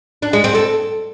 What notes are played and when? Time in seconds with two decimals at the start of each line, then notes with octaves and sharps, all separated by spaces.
0.22 D4
0.33 G#3
0.44 C4
0.55 A4